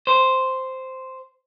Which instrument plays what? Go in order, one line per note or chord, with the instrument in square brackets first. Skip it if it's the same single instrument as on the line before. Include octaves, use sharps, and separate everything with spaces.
[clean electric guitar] C5